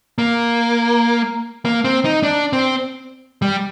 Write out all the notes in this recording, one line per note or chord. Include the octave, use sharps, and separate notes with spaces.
A#3
A#3
C4
D#4
D4
C4
G3